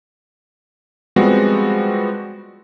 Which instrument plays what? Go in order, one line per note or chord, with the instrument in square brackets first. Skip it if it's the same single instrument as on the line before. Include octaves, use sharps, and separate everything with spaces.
[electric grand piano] F3 G3 G#3 B3 C4 F#4